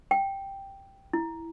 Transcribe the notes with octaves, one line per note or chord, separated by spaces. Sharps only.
G5
E4